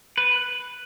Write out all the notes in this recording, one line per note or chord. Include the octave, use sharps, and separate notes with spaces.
B4